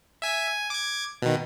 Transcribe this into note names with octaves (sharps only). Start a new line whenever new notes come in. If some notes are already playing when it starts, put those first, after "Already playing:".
E5 G#5 B6
G#5
D6 G#6
B2 D#3